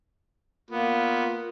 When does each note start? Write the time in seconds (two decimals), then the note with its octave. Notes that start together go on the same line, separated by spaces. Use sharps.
0.71 A#3 B3 F4